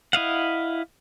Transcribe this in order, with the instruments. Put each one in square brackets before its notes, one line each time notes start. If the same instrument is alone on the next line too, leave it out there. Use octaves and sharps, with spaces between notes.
[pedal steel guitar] E4 D#5 F5 F#5